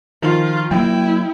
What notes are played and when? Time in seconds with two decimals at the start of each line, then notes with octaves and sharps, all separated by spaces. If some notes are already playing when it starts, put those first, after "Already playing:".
0.22 D#3 F3 F4
0.71 F#3 A#3 E4 G5